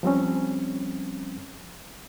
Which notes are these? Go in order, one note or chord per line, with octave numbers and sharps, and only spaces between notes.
F3 G3 C4 C#4